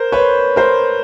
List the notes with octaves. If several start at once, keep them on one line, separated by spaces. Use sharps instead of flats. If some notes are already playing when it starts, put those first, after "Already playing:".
Already playing: A#4 C5
B4 C#5
A#4 C5